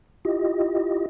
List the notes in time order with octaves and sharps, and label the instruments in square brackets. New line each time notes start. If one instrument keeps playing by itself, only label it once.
[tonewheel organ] E4 F4 G4 D#5